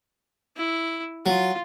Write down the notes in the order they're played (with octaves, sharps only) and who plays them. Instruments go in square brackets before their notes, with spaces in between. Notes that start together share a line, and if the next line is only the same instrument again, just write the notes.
[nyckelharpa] E4
[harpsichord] F#3 [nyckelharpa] F4